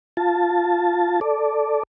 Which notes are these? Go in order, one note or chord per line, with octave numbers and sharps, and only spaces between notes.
F4 A5
A4 D5